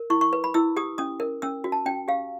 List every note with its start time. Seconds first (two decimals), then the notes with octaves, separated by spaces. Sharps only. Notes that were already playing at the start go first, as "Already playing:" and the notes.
Already playing: A#4
0.10 E4 C#6
0.21 C#6
0.33 B4
0.44 B5
0.54 E4 E6
0.76 G4 D#6
0.98 C#4 D#6
1.20 A#4
1.42 C#4 E6
1.64 F#4
1.72 A5
1.86 C#4 G5
2.08 G4 F5